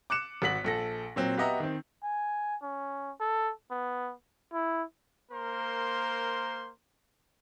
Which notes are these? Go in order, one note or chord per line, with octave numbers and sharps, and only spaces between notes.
D6 F#6 C#7 E7
G#1 F#4 B6 F#7
A#1 A4 A#6
A#2 F#3 C4
B3 F#4 G4 D#5 E5 A#5
D#3 C4
G#5
C#4
A4
B3
E4
A#3 A#4 C5 C6